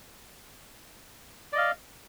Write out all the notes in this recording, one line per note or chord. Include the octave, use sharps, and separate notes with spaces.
D5 D#5 F5